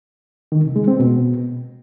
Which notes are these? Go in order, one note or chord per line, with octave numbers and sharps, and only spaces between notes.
D#3
C3
G#3
C4
B2